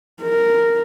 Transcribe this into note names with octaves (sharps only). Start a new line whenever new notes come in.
A#4